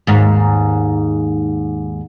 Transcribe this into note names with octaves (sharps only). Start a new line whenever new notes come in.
D#2 G#2